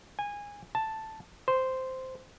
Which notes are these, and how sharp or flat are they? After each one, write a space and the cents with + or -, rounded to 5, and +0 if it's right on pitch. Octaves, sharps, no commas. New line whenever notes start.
G#5 -20
A5 +0
C5 -5